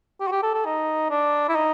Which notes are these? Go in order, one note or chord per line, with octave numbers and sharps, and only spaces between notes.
G4
F#4
G4
A4
A4
D#4
D4
E4
D#4